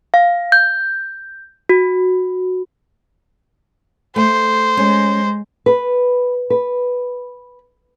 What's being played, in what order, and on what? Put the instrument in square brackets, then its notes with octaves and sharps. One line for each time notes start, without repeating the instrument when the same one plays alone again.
[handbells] F5
G6
F#4
[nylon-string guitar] A3 [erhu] C5
[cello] G#3 [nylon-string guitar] C#4
[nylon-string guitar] B4
B4